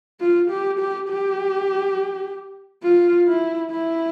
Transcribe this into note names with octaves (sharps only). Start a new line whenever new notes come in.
F4
G4
G4
G4
F4
E4
E4